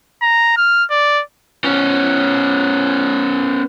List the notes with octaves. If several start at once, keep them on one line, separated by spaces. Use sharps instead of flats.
A#5
F6
D5
B3 C#4